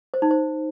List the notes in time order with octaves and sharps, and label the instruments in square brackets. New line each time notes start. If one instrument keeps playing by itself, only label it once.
[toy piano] C5
D#4
C5